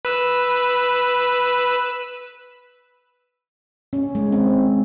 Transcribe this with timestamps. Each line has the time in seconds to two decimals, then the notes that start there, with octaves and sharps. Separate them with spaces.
0.05 B4 E6
3.93 C#4
4.15 G#3
4.32 C4